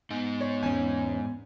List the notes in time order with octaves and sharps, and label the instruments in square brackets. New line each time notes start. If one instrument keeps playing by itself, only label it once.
[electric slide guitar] G#2 D#4 [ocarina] B3
[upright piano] C#5
[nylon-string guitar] E2 C#4 [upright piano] G#5